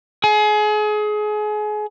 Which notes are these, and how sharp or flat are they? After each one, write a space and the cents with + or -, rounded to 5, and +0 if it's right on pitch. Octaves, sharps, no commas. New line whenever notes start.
G#4 +30